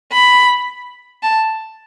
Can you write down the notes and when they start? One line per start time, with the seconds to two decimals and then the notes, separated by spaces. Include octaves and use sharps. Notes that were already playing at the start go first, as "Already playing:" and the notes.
0.12 B5
1.23 A5